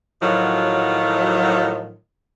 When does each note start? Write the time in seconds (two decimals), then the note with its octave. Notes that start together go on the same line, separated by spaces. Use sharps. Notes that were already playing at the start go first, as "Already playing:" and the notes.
0.21 A2 D#3 F3 F#3